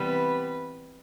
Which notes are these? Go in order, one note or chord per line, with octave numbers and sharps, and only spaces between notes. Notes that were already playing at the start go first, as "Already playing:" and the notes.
Already playing: C3 E3 G3 B3 B4